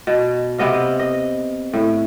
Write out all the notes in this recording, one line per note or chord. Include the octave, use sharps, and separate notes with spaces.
B2
C3 B3 D#5 F5
D#5
A2